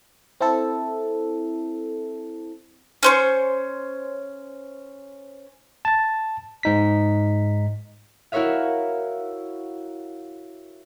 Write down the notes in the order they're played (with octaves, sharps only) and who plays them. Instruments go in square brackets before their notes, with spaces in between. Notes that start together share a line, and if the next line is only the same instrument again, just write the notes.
[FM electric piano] C4 E4 A4
[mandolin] C#4 C5 C#6
[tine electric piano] A5 A6
G#2 D#4 B6
[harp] E4 F#4 A#4 C#5 E5 F5